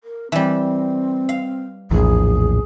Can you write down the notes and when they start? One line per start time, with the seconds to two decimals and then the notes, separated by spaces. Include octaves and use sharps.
0.04 A#4
0.32 E3 G3 C4
1.29 F5
1.91 A#1 E2 A2 G#4